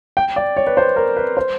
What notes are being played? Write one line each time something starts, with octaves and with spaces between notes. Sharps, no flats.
G5
D5
C#5
B4
C5
A#4
B4
C5